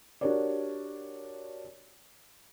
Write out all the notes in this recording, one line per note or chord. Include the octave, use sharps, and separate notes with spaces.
D4 F#4 G4 A#4 C#5 D5